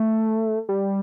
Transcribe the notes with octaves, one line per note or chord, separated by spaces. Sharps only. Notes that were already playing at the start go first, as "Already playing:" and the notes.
Already playing: A3
G3